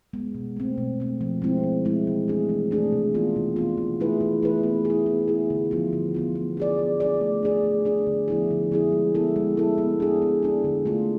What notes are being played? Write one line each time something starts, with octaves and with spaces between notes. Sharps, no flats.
G#3 B3
B2
A3 C4
B2
A3 C4
F3
G#3 C4 E4
F3
G#3 C4 E4
E3
A3 D4 G#4
E3
A3 D4 G#4
C3
E3 B3 F4
C3
E3 B3 F4
E3
A3 E4 G#4 B4
E3
A3 E4 G#4 B4
B3
G#4
E4
B3
E4 G#4
D3
F3 B3 F4
D3
F3 B3 F4
B3
D4 G#4 D5
B3
D4 G#4 D5
A3
D4 G#4 D5
A3
D4 G#4 D5
D3
F3 B3 E4 G#4
D3
F3 B3 E4 G#4
G#3
B3 E4 A4
G#3
B3 E4 A4
B3
D4 G#4
B3
D4 G#4
D3
A3 D4 F4